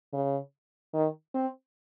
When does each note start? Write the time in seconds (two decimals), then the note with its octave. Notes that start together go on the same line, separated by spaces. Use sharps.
0.13 C#3
0.94 D#3
1.34 C4